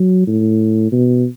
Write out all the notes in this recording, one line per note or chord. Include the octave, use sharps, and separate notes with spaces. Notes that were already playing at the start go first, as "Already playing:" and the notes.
Already playing: F#3
A2
B2